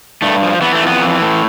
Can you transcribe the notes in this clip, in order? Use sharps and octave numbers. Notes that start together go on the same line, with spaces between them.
G2 A3
F3
E3 B3
A3
F2
B3
E3
A2